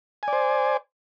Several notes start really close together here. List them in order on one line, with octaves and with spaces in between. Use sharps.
G#5 D5 C5